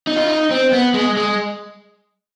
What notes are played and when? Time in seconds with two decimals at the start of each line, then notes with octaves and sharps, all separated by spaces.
0.07 D#4
0.16 F4
0.27 D#4
0.51 C4
0.73 B3
0.94 G#3
1.17 G#3